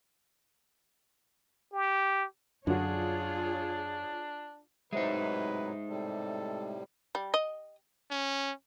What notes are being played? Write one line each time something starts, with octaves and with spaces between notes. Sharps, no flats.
G4
F#2 D3 D4 F4 F#4 G#4 C#5
A2 C3 F#3 G#3 D#4 B4 C5 E5
A2 C3 G3 A4
G3
D#5
C#4